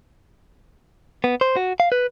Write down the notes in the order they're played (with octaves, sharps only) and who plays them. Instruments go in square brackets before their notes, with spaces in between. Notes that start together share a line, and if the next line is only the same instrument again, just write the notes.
[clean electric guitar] B3
C5
F#4
F5
B4